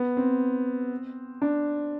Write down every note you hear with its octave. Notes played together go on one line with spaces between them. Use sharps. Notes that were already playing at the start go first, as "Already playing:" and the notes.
Already playing: B3
C4
D4